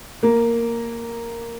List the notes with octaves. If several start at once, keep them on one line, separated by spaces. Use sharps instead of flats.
A#3